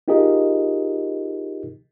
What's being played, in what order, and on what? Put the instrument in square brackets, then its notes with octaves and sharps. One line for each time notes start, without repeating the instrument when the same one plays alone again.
[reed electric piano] D#4 F4 G4 G#4 A#4 D#5